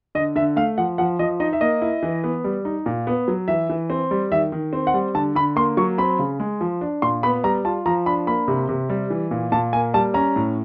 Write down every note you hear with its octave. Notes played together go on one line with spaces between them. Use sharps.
D3 D#5
D3 E5
A3 F5
F3 F#5
F3 F#5
F3 D#5
D#4 D#5
E5
A#3 D#5
E4
E3
B3
G3
D#4
A#2
B3
F#3
E3 E5
E3
C4
G3
D#3 E5
D#3
C4
F#5
G3
D3 A5
D3 B5
A#3 C6
F#3 C#6
C4 B5
C#3
G#3
F3
D4
A#2 C6
B3 B5
G3 A#5
F4 A5
F3 A#5
D4 B5
A#3 B5
C3
C3
G3
E3
A#2
A#2 A5
A#3 G#5
G3 A5
C#4 A#5
A2